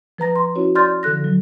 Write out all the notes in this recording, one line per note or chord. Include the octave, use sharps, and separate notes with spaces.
F3 B4 A#5 A#6
C6
C#4 E4 F#4 C#5
C#5 D5 C6 F6 G6 A6
D3 F3 A4 F#6 A#6
F#3